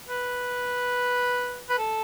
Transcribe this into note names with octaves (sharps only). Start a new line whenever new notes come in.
B4
B4
A4